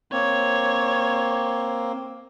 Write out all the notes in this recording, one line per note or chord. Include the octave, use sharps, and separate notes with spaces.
A#3 C4 C#5